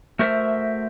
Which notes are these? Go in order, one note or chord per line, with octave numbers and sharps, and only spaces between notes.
A3 F#4 A#4 C5 E5